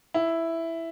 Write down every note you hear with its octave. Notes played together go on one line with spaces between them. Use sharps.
E4